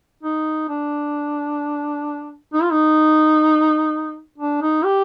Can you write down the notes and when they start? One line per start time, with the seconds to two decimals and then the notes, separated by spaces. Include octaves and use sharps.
0.23 D#4
0.69 D4
2.53 D#4
2.63 F4
2.71 D#4
4.38 D4
4.62 D#4
4.85 G4